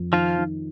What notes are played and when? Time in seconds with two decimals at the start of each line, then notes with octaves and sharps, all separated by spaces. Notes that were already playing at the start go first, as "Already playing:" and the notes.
Already playing: F2
0.13 D#3 F3 F4
0.38 D#3